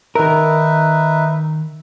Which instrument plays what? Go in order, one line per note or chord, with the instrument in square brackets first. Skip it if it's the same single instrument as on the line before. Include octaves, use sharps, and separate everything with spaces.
[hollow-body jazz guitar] D#3 A#4 [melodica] D#4 B4 E5